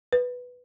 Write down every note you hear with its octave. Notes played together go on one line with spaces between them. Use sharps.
B4